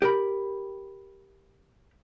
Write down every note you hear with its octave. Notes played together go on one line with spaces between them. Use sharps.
G4 A#4 B5